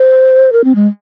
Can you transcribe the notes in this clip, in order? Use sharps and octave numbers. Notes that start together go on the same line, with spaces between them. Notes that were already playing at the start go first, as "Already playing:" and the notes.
Already playing: C5
A#4
C4
G#3